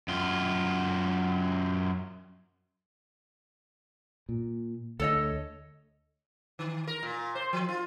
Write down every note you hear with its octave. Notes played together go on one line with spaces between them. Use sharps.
F#2 F4
A#2
D2 A4 C#5 D#5
D#3
A#4
A#2
C5
F3
F4